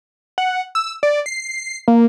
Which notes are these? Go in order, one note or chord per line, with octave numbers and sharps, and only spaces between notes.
F#5
E6
D5
C7
A#3